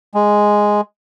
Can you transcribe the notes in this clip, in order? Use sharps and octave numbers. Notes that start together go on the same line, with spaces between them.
G#3